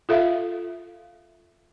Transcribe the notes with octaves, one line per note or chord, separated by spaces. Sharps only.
F4 A4 E5 F5